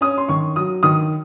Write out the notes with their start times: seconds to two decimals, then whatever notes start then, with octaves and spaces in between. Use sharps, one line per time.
0.01 C#4 D#6
0.18 C6
0.29 D#3 C#6
0.56 F#3 D#6
0.83 D#3 D#6